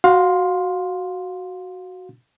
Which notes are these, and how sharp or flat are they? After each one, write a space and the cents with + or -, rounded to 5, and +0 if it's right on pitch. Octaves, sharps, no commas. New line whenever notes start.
F#4 +0 F5 +25 C6 +0